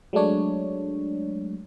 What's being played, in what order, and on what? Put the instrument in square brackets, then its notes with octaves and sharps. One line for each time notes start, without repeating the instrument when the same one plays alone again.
[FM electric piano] F#3 G#3 A3 D4 C#5